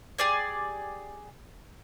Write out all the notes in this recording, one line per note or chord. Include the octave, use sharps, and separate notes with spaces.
G4 G#4 D5 G#5